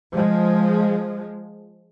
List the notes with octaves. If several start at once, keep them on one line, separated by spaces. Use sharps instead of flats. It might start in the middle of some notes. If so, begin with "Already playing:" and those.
F3 G#3